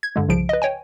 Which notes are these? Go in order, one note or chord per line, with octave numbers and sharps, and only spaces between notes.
G#6
G2 D3 G#3
C2 C#3 F3 D7
B4 D#5
C#5 G5 G#5